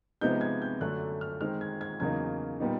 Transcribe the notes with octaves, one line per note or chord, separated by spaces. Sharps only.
C3 F3 G#3 B3 D#4 G6
G#6
G6
F#2 D3 F#3 A3 D4 F#6
F6
D#3 G#3 C4 F6
G#6
G#6
E2 C#3 F#3 A#3 D#4 G#6
A#2 G3 B3 D#4